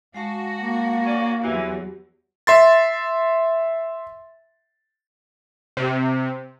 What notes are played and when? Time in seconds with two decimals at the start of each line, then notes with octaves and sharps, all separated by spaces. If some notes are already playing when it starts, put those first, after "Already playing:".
0.14 G#3 F#4 F5 A5
0.61 A#3
1.05 C#4 D4 D5
1.43 E2 E3 F#3 F#4 G4
2.47 E5 C6 A6
5.77 C3